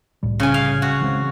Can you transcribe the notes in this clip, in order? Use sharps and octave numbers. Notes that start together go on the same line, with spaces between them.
C2 A2 G3
C#3 G#5
F5
F#4
E3 G#3 C4